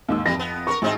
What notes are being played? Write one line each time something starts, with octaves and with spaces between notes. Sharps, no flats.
D#2 G#2 E6
F2 E3 G3 A#6
B3
B3 A4 A#4 C#6
A1 G#3 C4 D#4